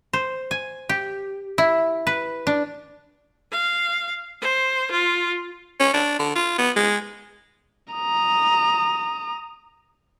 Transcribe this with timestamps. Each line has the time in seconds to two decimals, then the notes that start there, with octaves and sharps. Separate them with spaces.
0.13 C5
0.51 G#5
0.89 G4
1.58 E4
2.07 B4
2.47 D4
3.52 F5
4.42 C5
4.91 F4
5.79 C#4
5.94 D4
6.19 D3
6.36 F4
6.59 B3
6.76 G#3
7.94 A#5 D#6